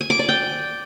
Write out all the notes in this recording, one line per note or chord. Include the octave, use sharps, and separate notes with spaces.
G#5
D6
D5
G5